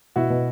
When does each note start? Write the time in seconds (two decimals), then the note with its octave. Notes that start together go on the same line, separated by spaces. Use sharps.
0.16 B2 E4 F#4
0.30 B2